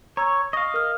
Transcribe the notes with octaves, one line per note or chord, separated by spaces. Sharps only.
C#5 A#5 E6 G#6
D#5 F5 C#6 A#6
A#4 F6